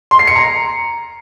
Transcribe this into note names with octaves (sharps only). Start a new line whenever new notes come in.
C6
C7
C#7
A#5